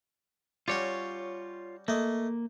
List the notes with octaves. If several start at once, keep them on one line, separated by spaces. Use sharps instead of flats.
G3 C#4 F4 F#4 C#5
A3 A#3 D#5